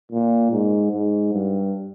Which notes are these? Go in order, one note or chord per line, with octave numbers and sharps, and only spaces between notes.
A#2
G#2
G#2
G2